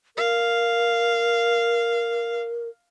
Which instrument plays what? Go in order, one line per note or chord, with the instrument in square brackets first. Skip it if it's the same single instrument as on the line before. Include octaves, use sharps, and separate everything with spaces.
[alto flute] A#4 [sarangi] F5